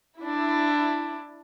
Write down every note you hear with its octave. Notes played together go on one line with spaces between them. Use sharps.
D4 E4